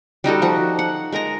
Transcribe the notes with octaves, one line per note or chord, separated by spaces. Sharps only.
G3 D#4 F#4 A4
F3 F#4
F#5
G#3 A#4 D#5 A#5